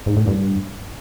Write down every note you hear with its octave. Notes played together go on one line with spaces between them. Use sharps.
G#2
A2
G2